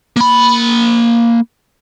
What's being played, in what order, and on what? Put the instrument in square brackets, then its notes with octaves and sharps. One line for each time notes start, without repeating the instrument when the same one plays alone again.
[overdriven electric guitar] A#3 B5